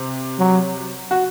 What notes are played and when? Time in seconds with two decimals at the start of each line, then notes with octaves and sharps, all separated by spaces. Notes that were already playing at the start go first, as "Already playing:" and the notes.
Already playing: C3 C4
0.39 F#3
1.11 F#4